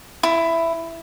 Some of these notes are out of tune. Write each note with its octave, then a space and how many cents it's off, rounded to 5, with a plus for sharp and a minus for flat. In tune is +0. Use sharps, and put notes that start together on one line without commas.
E4 +10